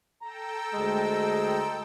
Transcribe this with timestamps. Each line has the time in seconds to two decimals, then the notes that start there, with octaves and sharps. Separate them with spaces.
0.22 A4 G5 A#5 E6
0.73 D2 G3 G#3